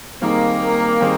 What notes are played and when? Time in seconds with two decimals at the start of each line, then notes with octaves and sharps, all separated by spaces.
0.21 D#3 G3 A#3 C4 D#4 G#4
1.01 D#3 G3 C4 D#4 G#4